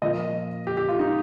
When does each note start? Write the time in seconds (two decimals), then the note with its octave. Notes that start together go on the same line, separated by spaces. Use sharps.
0.02 A#2 F3 A#3 D#5
0.67 G4
0.77 G4
0.89 F4
0.99 D#4